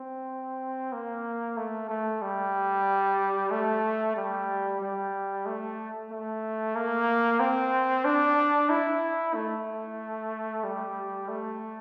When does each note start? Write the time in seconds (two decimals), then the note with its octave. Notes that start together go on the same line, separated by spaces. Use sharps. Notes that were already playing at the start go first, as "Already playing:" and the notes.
Already playing: C4
0.93 A#3
1.57 A3
1.89 A3
2.22 G3
3.51 A3
4.16 G3
4.81 G3
5.46 A3
6.11 A3
6.75 A#3
7.40 C4
8.05 D4
8.70 E4
9.34 A3
10.64 G3
11.28 A3